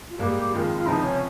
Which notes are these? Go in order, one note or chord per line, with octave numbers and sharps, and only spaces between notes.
F4
G#2 G3 A#3 G4
F2 D#3 G#3 F4
F4
C#2 C3 F3 C4 D#4
C#4